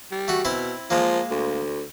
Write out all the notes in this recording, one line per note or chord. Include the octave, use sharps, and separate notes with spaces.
G3
A3 F#4
B2 C4 E4 C5
F3 G#3 A#3
D2